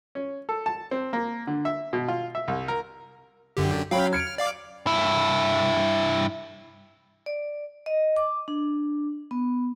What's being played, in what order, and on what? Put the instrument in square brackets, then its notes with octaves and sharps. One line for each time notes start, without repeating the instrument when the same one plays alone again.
[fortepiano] C#4
A4
A5
C4
A#3
D3
E5
B2
F4
E5
C2
A#4
[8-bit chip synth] F#2 D3 G4
[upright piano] F#3 C#4 [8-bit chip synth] F5 G5 B5
[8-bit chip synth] F6 [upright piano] G#6 C#7 D7
[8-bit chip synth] D5 F5 D6
[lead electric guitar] G2 E4
[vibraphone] D5
D#5
D6
D4
B3